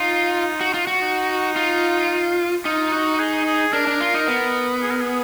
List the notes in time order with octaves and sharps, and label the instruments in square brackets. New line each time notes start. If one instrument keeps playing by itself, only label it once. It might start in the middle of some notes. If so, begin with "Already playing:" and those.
Already playing: [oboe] D#4 [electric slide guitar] F4
[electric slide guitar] F#4
F4
F#4
[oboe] D#4
[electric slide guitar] F4
[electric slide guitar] D#4 [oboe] F4
[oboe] F#4
G#4
G#4
[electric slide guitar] D4 [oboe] A#4
[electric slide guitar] D4
F4
D#4
B3
[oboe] G#4
A#4
G#4